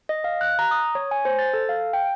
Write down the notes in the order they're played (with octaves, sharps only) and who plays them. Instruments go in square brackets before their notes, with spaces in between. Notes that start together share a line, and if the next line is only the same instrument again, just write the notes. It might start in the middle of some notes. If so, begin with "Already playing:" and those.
[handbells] D#5
F5
F#6
A#5
D#6
C#5
G#5
C5
A6
A4
F5
G5